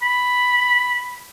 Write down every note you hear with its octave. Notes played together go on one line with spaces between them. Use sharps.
B5